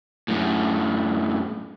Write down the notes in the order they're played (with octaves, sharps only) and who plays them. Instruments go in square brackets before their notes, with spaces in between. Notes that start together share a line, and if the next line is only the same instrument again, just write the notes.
[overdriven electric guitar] F#2 A2